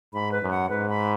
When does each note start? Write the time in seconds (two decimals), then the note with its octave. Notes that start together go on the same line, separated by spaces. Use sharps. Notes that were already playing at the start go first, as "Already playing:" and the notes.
0.14 G#2 B5
0.32 B4
0.42 F#2
0.51 F#5
0.70 G#2 B4
0.89 B5